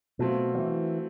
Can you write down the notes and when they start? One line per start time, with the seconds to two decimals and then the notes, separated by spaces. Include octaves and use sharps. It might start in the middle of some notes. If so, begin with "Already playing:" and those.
0.19 B2 F#3 A3 C4 F4
0.55 F3
0.58 E3